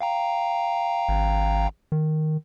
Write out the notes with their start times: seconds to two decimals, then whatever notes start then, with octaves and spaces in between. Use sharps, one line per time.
0.01 F5 G5 A#5
1.09 G#1
1.92 D#3